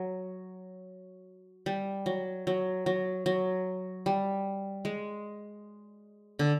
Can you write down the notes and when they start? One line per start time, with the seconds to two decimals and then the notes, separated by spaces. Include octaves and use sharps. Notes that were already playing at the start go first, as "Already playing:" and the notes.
Already playing: F#3
1.66 G3
2.06 F#3
2.47 F#3
2.86 F#3
3.26 F#3
4.06 G3
4.85 G#3
6.39 D3